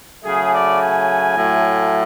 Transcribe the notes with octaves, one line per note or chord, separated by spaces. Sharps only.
C#3 F#3 A3 G#4
D5
G#5
A2 F#3 A3